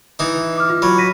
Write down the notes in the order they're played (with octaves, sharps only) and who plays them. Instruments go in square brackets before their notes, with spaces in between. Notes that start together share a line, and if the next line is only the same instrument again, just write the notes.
[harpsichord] E3 D#4
[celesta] D6 F6
F4
[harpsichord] F#3 [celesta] B5
[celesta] A#6 B6 D#7